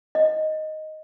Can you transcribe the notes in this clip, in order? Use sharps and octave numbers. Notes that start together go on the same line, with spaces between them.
D#5